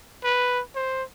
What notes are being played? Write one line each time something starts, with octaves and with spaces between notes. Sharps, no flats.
B4
C5